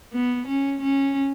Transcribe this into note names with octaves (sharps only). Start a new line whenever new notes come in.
B3
C#4
C#4